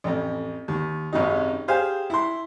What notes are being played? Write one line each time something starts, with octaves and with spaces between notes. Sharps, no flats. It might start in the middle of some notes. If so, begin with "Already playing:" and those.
A1 F2
D#2
G#1 F#2 C3 D#4
G4 G#4 C5 F5 G#5
E4 C6